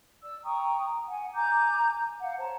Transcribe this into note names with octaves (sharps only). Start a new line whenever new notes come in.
D5 E6
G5 A#5 C#6 D#6
F#5 G#5
G#5 A#5 D6 G6
F5 F#5
C5 C#5 A5 A#5